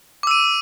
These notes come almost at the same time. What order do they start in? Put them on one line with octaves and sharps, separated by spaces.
D6 E6 D#7